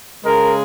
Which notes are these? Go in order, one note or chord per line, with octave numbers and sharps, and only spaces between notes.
C#3 G#3 A#4